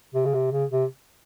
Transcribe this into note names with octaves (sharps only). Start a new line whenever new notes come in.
C3
C#3
C3
C#3
C3